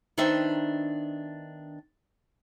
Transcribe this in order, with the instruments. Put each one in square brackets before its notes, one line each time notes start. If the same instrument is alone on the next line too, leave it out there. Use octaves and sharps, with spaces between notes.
[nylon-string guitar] D#3 B3 D4 C5 E5 G5